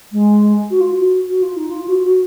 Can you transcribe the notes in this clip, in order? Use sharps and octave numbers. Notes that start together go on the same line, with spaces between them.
G#3
F#4
F4
F#4
F#4
F4
D#4
F4
F#4
F#4